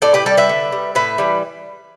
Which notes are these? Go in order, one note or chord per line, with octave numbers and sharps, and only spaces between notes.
A2 A4 D5
G4 B4
G3 A4 D5
B4 E5
D3
G3
A2 B4 E5
E3 G3